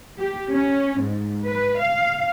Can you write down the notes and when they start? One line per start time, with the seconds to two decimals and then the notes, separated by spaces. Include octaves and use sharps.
0.19 G4
0.52 C#4
1.00 G#2
1.48 B4
1.81 F5